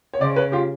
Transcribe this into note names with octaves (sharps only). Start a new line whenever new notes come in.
C#5
C#3 C5 D5
B4 C#5
F4 G4